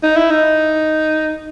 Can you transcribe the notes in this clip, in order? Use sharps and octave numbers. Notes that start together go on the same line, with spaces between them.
D#4
E4
D#4